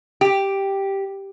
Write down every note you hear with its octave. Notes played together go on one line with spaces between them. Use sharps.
G4